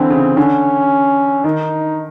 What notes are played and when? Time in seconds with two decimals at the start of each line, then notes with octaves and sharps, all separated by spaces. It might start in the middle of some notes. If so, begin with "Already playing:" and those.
Already playing: D3 E3 C4
0.10 C#3
0.37 D3 C#4
1.44 D#3 D#4